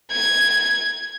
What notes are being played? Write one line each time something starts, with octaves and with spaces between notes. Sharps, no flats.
G#6